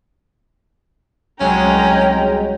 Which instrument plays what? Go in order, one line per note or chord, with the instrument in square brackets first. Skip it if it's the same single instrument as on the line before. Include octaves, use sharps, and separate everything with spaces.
[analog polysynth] C2 F#3 G#3 [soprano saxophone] C#4 [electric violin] G5 A#5